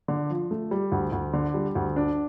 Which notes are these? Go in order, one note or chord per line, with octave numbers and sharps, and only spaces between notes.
D3
F3
A3
G3
D2
D2
D3
G3
D2
D4